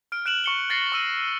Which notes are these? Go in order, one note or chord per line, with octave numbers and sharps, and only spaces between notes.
F6 D7
F#6 D7 E7 F#7
C#6 C#7 G7
F#6 A6 A#6 C7 C#7
C#6 E6 D#7